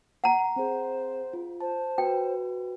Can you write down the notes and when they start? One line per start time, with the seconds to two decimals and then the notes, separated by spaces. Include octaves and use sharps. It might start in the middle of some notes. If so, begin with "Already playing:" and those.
0.24 F#5 A#5
0.56 C4 G#4 C5
1.33 F4
1.60 C5 A5
1.98 F#4 B4 G5